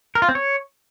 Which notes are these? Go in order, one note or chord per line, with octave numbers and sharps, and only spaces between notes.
A#4
F4
C4
C#5